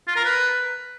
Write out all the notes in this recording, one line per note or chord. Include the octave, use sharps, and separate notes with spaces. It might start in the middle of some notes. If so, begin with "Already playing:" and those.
F4
A#4
B4